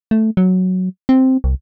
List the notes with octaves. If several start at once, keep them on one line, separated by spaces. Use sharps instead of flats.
A3
F#3
C4
C2